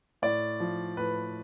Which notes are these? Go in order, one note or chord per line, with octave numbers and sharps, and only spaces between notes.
A2 D5
F3
A2 B4